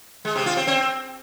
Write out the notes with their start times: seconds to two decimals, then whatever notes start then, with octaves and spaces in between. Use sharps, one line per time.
0.25 G#3
0.35 C3
0.46 F4
0.57 C4
0.67 C4